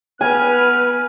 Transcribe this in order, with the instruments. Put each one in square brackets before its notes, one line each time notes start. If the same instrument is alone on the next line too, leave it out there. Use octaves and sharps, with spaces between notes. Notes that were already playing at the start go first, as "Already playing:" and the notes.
[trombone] B3 [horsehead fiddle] B4 [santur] G#5 [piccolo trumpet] F6